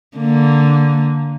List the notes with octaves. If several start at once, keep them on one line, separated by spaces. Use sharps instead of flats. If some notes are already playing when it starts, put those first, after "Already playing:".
D3 A#3